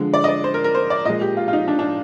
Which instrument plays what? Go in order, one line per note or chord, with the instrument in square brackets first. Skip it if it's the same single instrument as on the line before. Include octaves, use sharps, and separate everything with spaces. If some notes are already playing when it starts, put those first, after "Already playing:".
Already playing: [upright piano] D3 F3 G#3
D5
D#5
D5
C5
A#4
A#4
C5
D5
A#2 G#3 D#5
G4
F4
F4
D#4
D4
D4